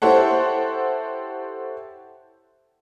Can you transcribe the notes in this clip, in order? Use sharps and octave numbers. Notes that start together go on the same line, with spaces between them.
E4 G4 A4 C5 C#5 F#5